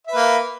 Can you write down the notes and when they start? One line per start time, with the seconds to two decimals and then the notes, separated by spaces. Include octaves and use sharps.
0.07 E5
0.12 B4
0.16 A#3